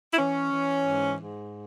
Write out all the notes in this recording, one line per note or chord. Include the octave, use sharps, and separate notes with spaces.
E4
E3 C#4
E3
G#2
G#2